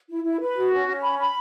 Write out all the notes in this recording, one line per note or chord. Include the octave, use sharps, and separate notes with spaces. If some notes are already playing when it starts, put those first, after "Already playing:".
E4
E4
B4
F#4
C#4
C#4
B5
B5